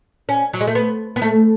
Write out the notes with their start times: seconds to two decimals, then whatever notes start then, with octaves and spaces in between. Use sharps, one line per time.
0.29 C#4
0.54 F#3
0.61 G#3
0.67 A3
0.75 B3
1.16 B3
1.22 A3